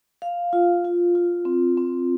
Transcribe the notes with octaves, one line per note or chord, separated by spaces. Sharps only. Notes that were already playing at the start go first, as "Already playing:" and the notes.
F5
F4
F4
F4
C4
C4